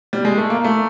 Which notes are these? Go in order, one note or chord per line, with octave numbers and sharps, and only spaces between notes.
G3
G#3
A3
A#3
A3